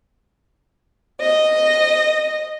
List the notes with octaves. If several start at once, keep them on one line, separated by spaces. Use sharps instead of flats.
D#5